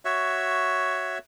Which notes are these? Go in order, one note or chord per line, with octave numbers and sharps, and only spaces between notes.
F#4 C#5 E5